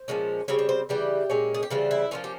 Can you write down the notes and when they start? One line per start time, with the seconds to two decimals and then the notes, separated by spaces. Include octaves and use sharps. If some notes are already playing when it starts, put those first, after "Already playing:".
Already playing: C5
0.08 A#2 F3 G#3 C#4
0.48 C#3 G3 C4 C#5
0.59 C#5
0.69 C5
0.89 C#3 E3 G3 G4
1.30 A#2 G#3 C#4
1.54 G#4
1.63 G4
1.70 C#3 E3 G3 C4 F4
1.91 E4
2.11 F3 A#3 C#4 F4
2.24 G4